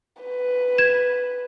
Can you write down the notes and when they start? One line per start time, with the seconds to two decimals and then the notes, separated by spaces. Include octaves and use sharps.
0.23 B4
0.78 G#6 E7